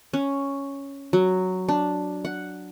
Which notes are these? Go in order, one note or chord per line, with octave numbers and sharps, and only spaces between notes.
C#4
F#3
D4
F#5